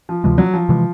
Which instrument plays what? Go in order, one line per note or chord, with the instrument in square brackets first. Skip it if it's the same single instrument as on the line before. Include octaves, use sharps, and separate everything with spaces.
[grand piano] F3
[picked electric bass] D2 C3 E3 G#3 [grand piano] F3
[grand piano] F#3
F3
[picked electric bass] C3 E3 G#3